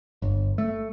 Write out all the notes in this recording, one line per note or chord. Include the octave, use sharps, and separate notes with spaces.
G1
A3